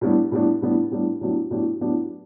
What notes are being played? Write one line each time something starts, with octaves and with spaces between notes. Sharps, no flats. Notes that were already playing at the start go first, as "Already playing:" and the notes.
A2 G3 B3 D4
A2 G3 B3 D4
A2 G3 B3 D4
A2 G3 B3 D4
A2 F#3 B3 D4 G4
A2 F#3 B3 D4 G4
A2 F#3 B3 D4 G4